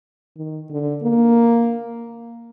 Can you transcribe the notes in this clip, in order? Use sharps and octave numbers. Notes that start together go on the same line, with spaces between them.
D#3
D3
A#3